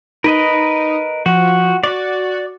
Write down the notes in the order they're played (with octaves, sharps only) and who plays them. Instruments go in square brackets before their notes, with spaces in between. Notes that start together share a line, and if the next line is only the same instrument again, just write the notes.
[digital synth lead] D#4 [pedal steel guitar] A#4 B4 D#5
[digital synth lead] F3 [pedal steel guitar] F#4
[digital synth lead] F#4 [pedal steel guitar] D5 D6